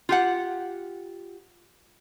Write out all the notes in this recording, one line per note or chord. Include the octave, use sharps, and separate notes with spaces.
F4 G4 F#5